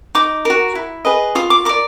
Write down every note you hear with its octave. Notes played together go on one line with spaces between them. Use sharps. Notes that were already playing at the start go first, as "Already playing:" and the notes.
D#4 D6
F#4 A#4
E4
G#4 B4 D#5
F4 D#6
D6
A#4 D5 D6